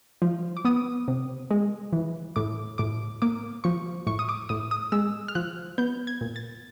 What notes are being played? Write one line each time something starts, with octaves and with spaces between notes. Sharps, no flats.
F3
D6
B3 D#6
C3
G#3
E3
A2 D6
A2 D6
A#3 D6
F3 C#6
A2 C#6
D#6
D6
A2 D#6
D#6
G#3 E6
F6
F3 F#6
B3 G6
G#6
A#2
A6